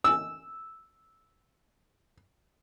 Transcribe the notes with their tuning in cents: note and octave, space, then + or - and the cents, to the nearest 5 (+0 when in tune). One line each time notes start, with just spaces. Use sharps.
E6 -5